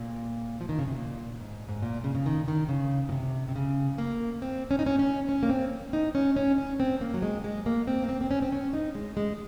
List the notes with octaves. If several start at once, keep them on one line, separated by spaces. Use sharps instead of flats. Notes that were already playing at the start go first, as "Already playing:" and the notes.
Already playing: A#2
F3
D#3
C#3
C3
A#2
G#2
G#2
A#2
C#3
C#3
D#3
D#3
C#3
A#2
C3
C3
C#3
A#3
C4
C#4
D#4
C#4
C#4
C#4
A#3
C4
D#4
C#4
C#4
C#4
C4
A#3
F#3
G#3
G#3
A#3
C4
A#3
C4
C4
C#4
C4
C#4
D#4
G#3
G#3